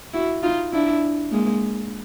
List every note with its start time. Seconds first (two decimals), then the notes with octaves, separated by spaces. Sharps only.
0.13 E4 F#4
0.43 D#4 F4
0.73 D4 E4
1.31 G#3 A#3